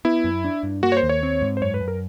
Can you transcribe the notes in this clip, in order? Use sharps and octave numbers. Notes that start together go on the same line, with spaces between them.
B3 E4
F#2
D4
G2
A#3 F#4
C#5
C5
D#2
C#5
C4
G#2
C5
F#2 C#5
B4
F#2
A#4